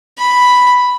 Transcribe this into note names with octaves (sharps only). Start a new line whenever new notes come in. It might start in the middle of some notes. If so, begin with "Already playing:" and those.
B5